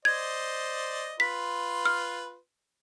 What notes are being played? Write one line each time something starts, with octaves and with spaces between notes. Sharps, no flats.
C5 D5 D#5 G#6
F4 B4 C6 B6
F6